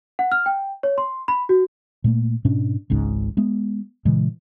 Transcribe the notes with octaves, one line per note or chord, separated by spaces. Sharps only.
F#5
F6
G5
C#5
C6
B5
F#4
A#2 A3 A#3
G#2 B2 C#4 D4
G#1 C#2 G#2 C#3
G#3 B3
A#2 C#3 E3 G#3